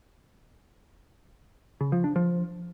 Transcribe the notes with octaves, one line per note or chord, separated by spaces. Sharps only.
C#3
F3
D4
F3